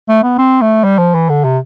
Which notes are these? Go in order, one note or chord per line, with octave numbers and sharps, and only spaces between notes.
A3
B3
C4
A3
G3
F3
E3
D3
C3